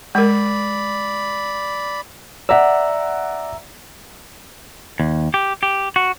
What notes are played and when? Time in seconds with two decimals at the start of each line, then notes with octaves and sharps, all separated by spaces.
0.15 G#3 A#4 D5 B5
2.49 D5 E5 F#5 A#5 E6
5.00 D#2
5.34 G4
5.63 G4
5.96 F#4